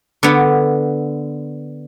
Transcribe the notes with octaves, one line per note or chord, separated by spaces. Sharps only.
D3 B3